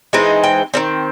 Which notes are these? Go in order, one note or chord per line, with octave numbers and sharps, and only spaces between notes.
E3 G#3 C4 D#4
G5
D#3 G3 C4